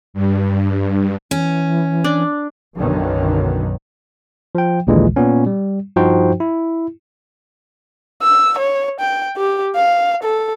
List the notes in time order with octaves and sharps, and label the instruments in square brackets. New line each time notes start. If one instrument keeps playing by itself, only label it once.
[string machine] G2
[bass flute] E3 [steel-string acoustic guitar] C#4
[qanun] D4
[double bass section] B1 F#2 B2 D3 D#3 F#3
[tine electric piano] F3 G5
A#1 D#2 A#2 D3 E3 G#3
A#2 B3 C#4
G3
G2 F3 D#4 F#4 C5 G5
E4
[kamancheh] E6
C#5
G5
G4
F5
A4